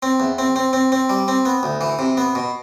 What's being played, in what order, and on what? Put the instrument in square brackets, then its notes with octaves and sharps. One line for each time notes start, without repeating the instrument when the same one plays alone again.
[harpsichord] C4
E2
C4
C4
C4
C4
G3
C4
B3
D2
E3
C3
B3
B2